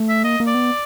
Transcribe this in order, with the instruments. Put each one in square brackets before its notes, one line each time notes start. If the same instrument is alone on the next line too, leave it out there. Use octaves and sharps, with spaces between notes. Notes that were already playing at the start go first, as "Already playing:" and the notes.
Already playing: [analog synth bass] A3
[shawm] E5
[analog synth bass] A#3 [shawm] D#5
[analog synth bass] A#3
[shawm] D5
[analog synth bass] B3